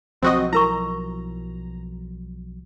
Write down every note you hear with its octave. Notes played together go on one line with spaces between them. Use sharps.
B1 F3 F#3 C4 F#4 D#5
E4 A#4 A#5 C#6